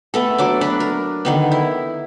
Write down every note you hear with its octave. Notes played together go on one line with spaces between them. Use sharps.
A3 B3 A4
F#3 D4 D6
D4 B4
A#4
D3 D#3 B3
E4